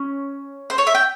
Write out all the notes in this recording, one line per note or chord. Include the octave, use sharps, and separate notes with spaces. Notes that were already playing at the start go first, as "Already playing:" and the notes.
Already playing: C#4
C5
C#5
E5
G5